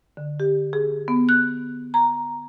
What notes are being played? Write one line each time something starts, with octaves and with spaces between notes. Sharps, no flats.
D3
G4
G#4
B3
F#6
A#5